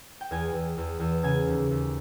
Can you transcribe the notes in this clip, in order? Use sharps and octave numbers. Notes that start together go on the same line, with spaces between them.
G5
E2 G#5
E2
E2
E2
C#3 G#5
D#2
D#2